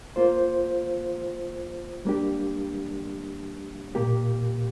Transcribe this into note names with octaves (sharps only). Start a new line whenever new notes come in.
A#3 F4 C5
G3 A#3 D4 G4
A#2 A#3 G4